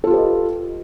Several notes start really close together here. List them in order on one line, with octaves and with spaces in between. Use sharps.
A4 F4 G4 B4 D#5